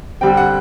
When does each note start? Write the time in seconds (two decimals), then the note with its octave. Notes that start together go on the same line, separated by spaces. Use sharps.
0.21 D3 G3 C4 G5
0.37 F#5